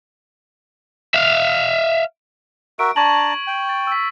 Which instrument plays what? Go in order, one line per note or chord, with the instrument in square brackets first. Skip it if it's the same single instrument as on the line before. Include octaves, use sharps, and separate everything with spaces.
[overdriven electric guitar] E5 F5
[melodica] F#4 A#4 E5 [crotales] D7
[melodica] D4 A5 A#5 [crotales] C#6 G#6 F#7
[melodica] G5
[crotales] A6
E6 B6